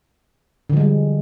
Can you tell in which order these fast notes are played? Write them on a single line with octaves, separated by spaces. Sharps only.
D3 F3 G#3 G3